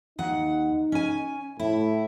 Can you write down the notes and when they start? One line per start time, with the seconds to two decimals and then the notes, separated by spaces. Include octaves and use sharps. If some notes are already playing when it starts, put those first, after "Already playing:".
0.19 D#2 D#4 F#5
0.92 C#4 G#5
1.60 A2 E4